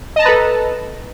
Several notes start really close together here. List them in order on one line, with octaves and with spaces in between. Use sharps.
D#5 A5 A#5 B4 A4